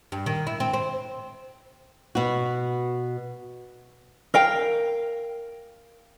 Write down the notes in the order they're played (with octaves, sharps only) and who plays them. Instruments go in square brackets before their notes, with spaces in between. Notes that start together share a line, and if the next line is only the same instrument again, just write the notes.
[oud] G2
D#3
E4
C4
C4
[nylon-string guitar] B2 F#4
[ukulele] A#4 F5 G5